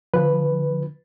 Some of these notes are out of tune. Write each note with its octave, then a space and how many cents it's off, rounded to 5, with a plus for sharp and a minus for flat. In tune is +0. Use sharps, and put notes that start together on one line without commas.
D3 +0 F3 -5 B4 +0